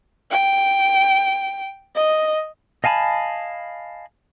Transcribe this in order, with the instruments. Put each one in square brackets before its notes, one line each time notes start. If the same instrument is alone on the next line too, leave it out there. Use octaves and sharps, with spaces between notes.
[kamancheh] G5
D#5
[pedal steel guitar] D#5 F5 G#5 A5 B5